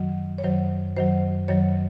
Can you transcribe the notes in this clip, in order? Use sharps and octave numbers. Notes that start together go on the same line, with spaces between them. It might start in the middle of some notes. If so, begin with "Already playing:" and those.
Already playing: F#2 D#3 F#3
C#5
F#2 D#3 F#3 C5
F#2 D#3 F#3 C5
F#2 D#3 F#3 C#5